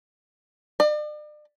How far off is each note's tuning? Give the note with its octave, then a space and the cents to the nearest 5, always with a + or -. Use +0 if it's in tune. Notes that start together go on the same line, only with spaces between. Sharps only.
D5 +40